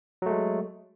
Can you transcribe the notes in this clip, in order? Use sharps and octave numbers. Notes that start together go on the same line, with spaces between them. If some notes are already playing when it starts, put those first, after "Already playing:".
F#3 G#3 A3